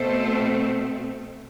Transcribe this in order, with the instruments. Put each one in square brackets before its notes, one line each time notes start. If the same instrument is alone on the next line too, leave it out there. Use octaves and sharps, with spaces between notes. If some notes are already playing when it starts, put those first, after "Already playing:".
Already playing: [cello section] B2 A3 C4 A4 C5